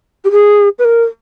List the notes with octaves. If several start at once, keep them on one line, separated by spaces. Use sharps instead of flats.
G4
G#4
B4
A#4